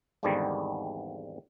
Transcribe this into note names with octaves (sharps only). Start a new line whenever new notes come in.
G#1 E2 G#2 D3 D#3 G3